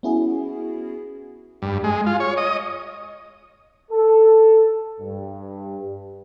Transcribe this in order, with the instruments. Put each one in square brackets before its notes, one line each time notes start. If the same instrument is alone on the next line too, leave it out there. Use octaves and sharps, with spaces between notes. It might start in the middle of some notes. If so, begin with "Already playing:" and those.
[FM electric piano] B3 C#4 E4 F#4 G#4
[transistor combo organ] G2
G#3
F4
C#5
D#5
[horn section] A4
G2